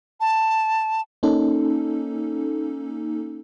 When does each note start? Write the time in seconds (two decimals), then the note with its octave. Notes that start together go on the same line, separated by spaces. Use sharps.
0.21 A5
1.23 A#3 C#4 D#4 A4